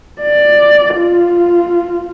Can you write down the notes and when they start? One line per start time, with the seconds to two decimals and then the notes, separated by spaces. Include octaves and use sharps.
0.22 D5
0.96 F4